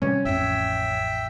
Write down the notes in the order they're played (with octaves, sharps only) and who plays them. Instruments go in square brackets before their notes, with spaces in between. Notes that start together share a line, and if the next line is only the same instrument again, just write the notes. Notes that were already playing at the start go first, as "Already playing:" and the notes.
[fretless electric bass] C3 G3 [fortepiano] C#4
[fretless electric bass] A1 F2 [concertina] E5 G5 E6